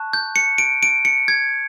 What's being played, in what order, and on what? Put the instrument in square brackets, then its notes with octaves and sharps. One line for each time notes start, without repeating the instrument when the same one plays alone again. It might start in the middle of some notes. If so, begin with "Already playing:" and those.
Already playing: [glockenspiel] A5 C#6 F#6
G6
C#7
D7
D7
C#7
G#6